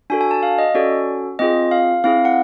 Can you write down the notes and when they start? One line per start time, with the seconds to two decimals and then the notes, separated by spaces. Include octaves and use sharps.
0.10 D4 F#4 A4 G#5
0.21 G#5
0.31 A5
0.43 F5
0.59 D#5
0.74 C#4 F#4 A4 D5
1.39 C4 F4 G#4 D#5
1.71 F5
2.04 C4 E4 G#4 F5
2.25 F#5